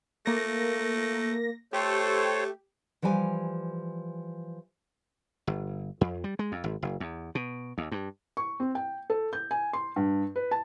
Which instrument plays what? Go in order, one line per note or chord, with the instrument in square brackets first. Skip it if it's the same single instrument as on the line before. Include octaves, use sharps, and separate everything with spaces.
[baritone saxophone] A3 [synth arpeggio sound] A#3 A#6
[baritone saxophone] A3 [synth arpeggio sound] G4 [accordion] A4 C5 C#5
[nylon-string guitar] E3 F3 G3 G4 G#5
[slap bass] G1
F2
G3
G#3
F2
G#1
F#1
E2
B2
D#2
G2
[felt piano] C#6
C4
G5
A4
G6
G#5
C6
G2
B4
A5